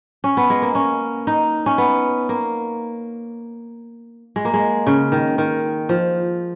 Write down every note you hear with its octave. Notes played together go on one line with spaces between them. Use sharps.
C#4
B3
G#3
A#3
C#4
D#4
C#4
B3
A#3
G#3
A#3
G#3
C#3
D#3
D#3
F3